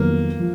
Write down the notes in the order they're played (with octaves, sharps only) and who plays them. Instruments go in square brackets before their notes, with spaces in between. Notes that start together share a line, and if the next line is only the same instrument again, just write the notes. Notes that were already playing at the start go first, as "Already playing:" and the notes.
Already playing: [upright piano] F2 D#3 F#3 B3 [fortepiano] A#3
[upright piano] F3